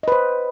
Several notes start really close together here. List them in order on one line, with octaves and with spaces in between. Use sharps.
D#5 B4 C5